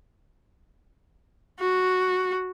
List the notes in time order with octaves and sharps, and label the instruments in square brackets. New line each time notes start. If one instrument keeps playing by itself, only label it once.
[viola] F#4